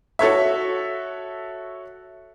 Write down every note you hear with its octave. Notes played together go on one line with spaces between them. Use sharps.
F#4 A4 C#5 E5